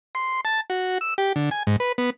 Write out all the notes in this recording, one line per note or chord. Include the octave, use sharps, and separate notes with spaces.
C6
A5
F#4
E6
G4
D3
G#5
G#2
B4
B3